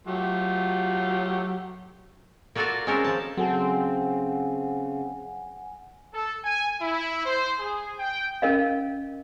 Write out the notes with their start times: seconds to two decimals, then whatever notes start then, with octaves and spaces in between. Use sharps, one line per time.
0.07 F#3 A3 F4 G4
2.55 A#3 F4 F#4 A4 D5 F5
2.87 G#3 A#3 C4 C#4 A4 A#4
3.04 F3 A5
3.37 C#3 F#3 C4 A4 F#5 G#5
6.13 A4
6.45 G#5
6.81 E4
7.26 C5
7.60 G#4
7.99 G5
8.42 C#4 A#4 D#5 F5